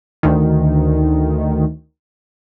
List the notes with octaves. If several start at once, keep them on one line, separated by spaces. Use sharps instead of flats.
D2 D#3